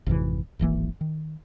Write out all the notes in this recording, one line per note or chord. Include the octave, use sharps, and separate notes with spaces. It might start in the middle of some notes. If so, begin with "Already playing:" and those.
G#1 F2 C3 E3
D1 G#1 E3 A#3
D#3